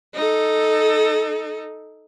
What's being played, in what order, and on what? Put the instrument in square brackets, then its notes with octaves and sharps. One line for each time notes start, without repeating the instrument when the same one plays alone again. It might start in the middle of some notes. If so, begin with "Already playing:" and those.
[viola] D#4 A4